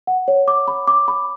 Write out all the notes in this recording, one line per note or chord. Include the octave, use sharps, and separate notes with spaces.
F#5
C#5
D6
B5
D6
B5